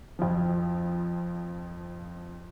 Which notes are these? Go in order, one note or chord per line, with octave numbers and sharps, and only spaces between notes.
F2 F3